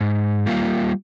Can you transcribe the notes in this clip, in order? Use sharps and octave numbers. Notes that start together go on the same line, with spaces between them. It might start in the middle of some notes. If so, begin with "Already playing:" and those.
G#2
G3 A#3 F4